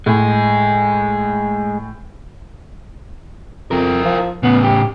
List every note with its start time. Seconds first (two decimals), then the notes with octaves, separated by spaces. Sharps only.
0.06 A2 G#3 G#4
3.71 F2 E4 A#4
4.05 F3
4.43 A2 C#3 B3
4.64 G4